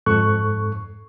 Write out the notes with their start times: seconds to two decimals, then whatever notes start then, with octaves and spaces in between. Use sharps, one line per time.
0.06 F2 G#2 A4 C#6 F#6